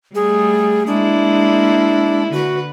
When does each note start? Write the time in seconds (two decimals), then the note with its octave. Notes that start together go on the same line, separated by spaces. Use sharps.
0.15 G3 A3 G#4
0.87 G#3 A#3 D4 E4
2.33 D3 F#4 B4